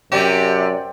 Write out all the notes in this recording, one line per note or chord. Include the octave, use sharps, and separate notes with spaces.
F#2 C3 G4 D5